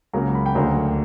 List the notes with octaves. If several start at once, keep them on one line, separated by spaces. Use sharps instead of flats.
C#2 C#3 F#3 A#3 A#5
B5
G5
D2 D3 F#3 A#3 A#5